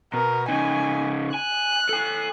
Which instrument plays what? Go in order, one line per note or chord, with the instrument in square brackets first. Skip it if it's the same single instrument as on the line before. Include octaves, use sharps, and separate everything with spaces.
[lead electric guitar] B2 [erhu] A#4
[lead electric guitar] C#3 D#4 [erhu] G#5
[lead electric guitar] G#5 [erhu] F#6
[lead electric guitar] A4 G#5